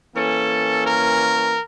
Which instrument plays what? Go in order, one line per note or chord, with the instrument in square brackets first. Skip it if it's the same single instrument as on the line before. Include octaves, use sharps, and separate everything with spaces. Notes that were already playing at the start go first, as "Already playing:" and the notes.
[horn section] E3 A#3 C#4 A4
A#4